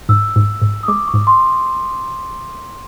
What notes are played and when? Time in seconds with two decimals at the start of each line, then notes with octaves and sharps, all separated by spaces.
0.09 G#2 E6
0.36 G#2
0.62 G#2
0.83 D#6
0.88 G#3 D6
1.08 C#6
1.14 G#2
1.27 C6